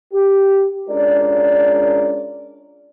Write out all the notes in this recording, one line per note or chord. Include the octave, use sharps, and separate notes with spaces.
G4
G#3 C#4 D4 F4 A#4 D5